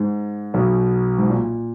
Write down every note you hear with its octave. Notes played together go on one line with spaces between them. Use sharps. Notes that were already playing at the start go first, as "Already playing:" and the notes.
Already playing: G#2
B1 B2
G#2
A#2